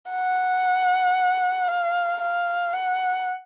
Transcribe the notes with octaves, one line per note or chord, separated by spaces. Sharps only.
F#5
F5
F5
F#5